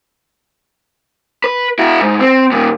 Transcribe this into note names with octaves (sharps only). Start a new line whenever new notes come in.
B4
E4 F#4
G#2
C4
D#2 A#2